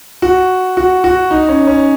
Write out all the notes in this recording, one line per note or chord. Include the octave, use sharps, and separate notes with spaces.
F#4
F#4
F#4
D#4
C#4
C#4